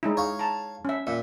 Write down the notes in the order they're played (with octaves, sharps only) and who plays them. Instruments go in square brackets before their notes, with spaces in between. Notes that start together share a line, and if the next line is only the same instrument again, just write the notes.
[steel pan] G#3 D#4 E4
[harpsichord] C#5 F5
[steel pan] A5 A#5
C#4 E5
[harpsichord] A#2 [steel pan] E5